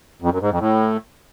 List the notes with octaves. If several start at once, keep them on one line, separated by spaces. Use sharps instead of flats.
F2
F#2
G#2
F2
A2